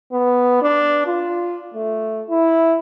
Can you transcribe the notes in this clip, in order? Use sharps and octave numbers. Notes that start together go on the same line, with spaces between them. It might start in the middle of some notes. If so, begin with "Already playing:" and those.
B3
D4
F4
A3
E4